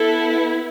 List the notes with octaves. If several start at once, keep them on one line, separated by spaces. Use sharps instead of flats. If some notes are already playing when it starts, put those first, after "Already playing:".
Already playing: B3 E4 A4